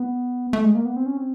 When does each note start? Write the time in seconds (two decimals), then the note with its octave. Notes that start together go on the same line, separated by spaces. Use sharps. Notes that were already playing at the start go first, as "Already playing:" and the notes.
Already playing: B3
0.53 A3
0.64 G#3
0.75 A#3
0.85 B3
0.97 C4
1.06 C#4
1.17 C4